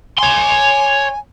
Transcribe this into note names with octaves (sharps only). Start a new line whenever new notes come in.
C#5 G#5 C6